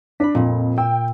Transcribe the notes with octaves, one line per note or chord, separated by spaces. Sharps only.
D4 B5 B6
F2 A#2
G5 E6